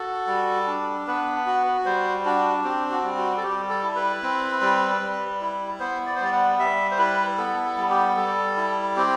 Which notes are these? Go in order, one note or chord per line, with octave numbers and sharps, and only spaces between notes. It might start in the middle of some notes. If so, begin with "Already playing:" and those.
Already playing: F#4 A4
G3
D4
B3 B4
F#4
G3 C5
D4 F#4
C4 G4
F#4
G3
F#4
A4
G3 G4
A4
E4
B4
C4
G3
G3
E4
B3 C5
D5
C5
G3 D5
F#5
G3 E5
C5
E4 B4
B3 A4
A4
G3
G4
G3 A4
E4
C4 G4